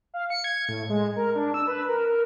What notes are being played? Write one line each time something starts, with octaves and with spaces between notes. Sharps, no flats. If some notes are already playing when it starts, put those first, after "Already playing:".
F5
C#7
G#6
A2
G#3
A#4
D4
E6
B4
A#4
A#4